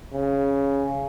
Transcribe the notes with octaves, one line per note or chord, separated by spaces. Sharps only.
C#3